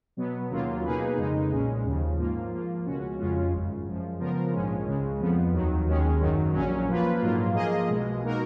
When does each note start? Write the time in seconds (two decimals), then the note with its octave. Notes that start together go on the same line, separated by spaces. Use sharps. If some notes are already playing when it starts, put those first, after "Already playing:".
0.17 B2 F#3 B3
0.50 D#2 C#3 F#3 A#3 F4
0.84 B2 A#3 D#4 G#4 B4
1.17 F2 C#3 G#3 D#4
1.51 B1 A#2 G#3 C#4
1.84 D#2 C#3 F3
2.18 G#2 F3 A#3 F4
2.52 F3 A#3 F4
2.85 C#2 B2 G#3 C#4 F#4
3.19 F2 C#3 G#3 C#4 F4
3.52 G#1 F#2 C#3
3.86 F#2 F3 G#3
4.20 C#3 F3 B3 F4 A#4
4.52 A#1 G#2 F3 G#3 C#4
4.86 C#2 C#3 G#3
5.20 F2 F3 B3
5.54 D#2 D#3 F#3
5.87 D#2 D#3 G#3 C#4
6.21 G#1 F#2 D#3 F#3
6.54 A#1 A#2 F#3 C#4
6.88 F3 A#3 F4 B4
7.21 A#1 G#2 F#3 A#3 F4
7.55 F3 A#3 F4 G#4 D#5
7.89 B1 B2 G#3
8.22 B2 A#3 D#4 F#4 A#4